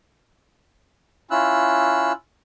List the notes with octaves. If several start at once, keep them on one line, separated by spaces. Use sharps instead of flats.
C#4 E4 F4 E6 F#6